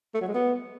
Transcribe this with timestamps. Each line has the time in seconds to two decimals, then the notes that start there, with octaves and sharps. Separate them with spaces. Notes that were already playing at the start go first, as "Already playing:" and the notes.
0.15 A3
0.21 F#3
0.28 G#3
0.34 B3